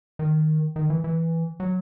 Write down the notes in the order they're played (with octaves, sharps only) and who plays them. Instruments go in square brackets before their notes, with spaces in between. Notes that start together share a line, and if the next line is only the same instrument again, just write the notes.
[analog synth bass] D#3
D#3
E3
E3
F#3